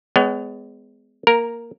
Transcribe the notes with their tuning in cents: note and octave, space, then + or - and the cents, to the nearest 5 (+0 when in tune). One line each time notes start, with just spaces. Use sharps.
G#3 +0 B3 +30 C#5 +35
A#3 +0 A#4 +0 A#5 +20